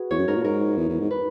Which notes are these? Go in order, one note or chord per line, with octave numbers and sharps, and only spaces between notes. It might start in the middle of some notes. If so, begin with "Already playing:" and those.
Already playing: F#4 G#4 B4
E2 C#5
F#2
G#2 A#4
A#2
G#2 A#4
E2
E2
G#2
B4